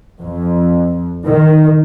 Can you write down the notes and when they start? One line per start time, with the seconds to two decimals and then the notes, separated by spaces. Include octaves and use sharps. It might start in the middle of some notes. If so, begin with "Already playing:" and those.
0.21 F2
1.27 D#3